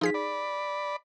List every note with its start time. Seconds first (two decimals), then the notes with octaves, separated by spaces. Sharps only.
0.01 F3 D#4 G#4 B6
0.14 D5 B5